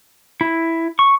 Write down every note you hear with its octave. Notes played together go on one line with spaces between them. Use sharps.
E4
C#6